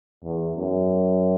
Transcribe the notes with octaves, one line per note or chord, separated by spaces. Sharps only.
E2
F#2